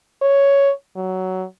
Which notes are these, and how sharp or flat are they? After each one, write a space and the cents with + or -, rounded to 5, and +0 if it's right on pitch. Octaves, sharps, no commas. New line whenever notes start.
C#5 +5
F#3 +15